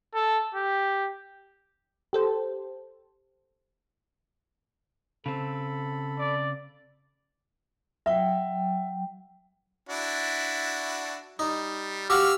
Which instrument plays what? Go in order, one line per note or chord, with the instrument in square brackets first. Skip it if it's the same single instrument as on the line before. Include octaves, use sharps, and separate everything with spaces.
[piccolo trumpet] A4
G4
[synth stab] G4 A4 C5
[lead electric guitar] C#3 C4 [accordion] A4 B5
[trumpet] D5
[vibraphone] F#3 G5 [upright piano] E5
[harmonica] D4 E4 F#4
[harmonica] G3 [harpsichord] D#4
[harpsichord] F#4 G4 [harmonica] F5 E6 F6